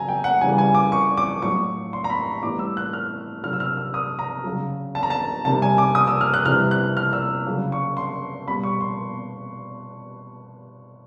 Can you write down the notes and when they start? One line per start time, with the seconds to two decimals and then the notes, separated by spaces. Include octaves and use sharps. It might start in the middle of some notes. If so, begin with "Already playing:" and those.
Already playing: C#3 F#3 G#5 A#5
0.09 G5
0.24 F#5
0.41 C#3 E3 G3 G#5
0.58 G#5
0.75 D6
0.92 C#6
1.17 D6
1.42 A2 F#3 C#6
1.93 C6
2.04 A#5
2.10 B5
2.43 A2 E3 G3 D6
2.59 E6
2.77 F#6
2.93 F6
3.43 C3 D#3 F#3 F6
3.53 E6
3.60 F6
3.77 E6
3.94 D#6
4.19 A#5
4.44 C#3 F#3
4.95 A5
5.03 A#5
5.10 A5
5.45 C3 D#3 G3 A5
5.62 G#5
5.78 D6
5.95 D#6
6.07 E6
6.21 F6
6.34 F#6
6.45 C3 E3 G3 F6
6.71 F#6
6.97 F6
7.13 E6
7.46 C#3 F#3
7.72 C#6
7.97 C6
8.48 B2 G3 B5
8.63 C#6
8.81 C6